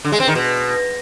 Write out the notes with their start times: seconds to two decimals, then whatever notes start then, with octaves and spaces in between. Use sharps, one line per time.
0.05 D3
0.12 G#3
0.20 C4
0.28 D#3
0.35 B2